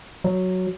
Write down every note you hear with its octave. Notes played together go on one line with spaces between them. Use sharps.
F#3